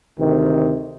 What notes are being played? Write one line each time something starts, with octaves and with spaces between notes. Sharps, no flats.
D2 C3 D#3